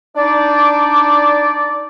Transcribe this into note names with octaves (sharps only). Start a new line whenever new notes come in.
D4 D#4 D5